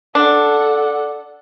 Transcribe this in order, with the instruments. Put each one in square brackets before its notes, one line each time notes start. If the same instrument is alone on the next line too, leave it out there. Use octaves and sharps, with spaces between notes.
[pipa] D4 [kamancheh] A4 F#5